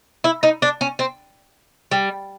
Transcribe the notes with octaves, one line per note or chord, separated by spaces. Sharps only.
E4
D#4
D4
C#4
C4
G3